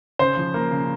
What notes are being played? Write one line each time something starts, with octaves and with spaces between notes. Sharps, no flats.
C#3 C5
F3
A#3
C#3